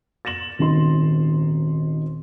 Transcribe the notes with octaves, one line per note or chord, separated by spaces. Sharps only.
A6 A#6 E7 F#7
D#1 G#1 D#4 C6